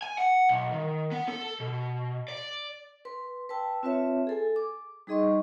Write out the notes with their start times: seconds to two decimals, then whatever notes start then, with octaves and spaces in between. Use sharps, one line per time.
0.02 G#5
0.18 F#5
0.49 B1
0.72 D#3
1.12 B3
1.28 A4
1.60 B2
2.28 D5
3.05 B4 C6
3.49 B4 G5 A5 E6
3.83 C4 F4 B4 C#5 E5 A5
4.27 G#4 A4 G#5
4.56 D6
5.07 G3 D#4 G#4 D#5 C6 C#6